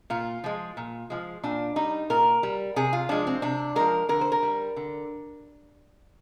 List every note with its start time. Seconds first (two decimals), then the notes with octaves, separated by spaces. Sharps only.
0.10 A#2 F4
0.44 F3 G#3
0.77 A#2
1.10 F3 G#3
1.43 A#2 D4
1.76 G3 D#4
2.10 A#2 A#4
2.43 G3
2.76 C3 G#4
2.93 F4
3.09 F3 G#3 D4
3.27 C4
3.42 C3 D4
3.76 F3 G#3 A#4
4.09 D3 A#4
4.21 C5
4.32 A#4
4.43 G3
4.77 D3